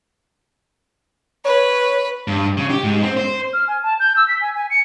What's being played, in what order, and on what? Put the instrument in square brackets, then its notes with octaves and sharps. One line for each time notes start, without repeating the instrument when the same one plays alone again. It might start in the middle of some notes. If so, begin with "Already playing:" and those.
[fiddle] B4 [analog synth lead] C#5
[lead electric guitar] G2
C#3
G4
G#2
C4
C5
[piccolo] F6
G#5
A5
G6
E6
B6
G#5
G#5
C#7